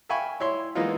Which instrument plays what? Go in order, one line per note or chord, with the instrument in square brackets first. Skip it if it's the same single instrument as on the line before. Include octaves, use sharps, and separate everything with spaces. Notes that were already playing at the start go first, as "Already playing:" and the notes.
[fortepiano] E5 F5 G5 G#5 B5 C#6
E4 C#5 E5 C6
E3 G#3 A#3 B3 D#4 F4